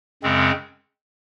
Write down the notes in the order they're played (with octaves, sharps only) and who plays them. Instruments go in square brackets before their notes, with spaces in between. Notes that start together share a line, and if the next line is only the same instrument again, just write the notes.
[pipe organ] F#2 C#3 G#3 C4